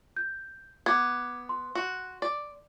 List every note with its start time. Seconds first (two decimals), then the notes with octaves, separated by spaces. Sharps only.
0.16 G6
0.86 B3 D6 G#6
1.49 C6
1.75 F#4
2.22 D5